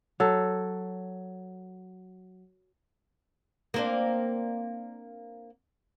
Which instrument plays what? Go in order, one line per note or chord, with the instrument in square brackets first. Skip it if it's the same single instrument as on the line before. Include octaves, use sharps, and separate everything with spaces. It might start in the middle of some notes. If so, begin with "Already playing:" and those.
[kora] F#3 A4
[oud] A#3 C4 D4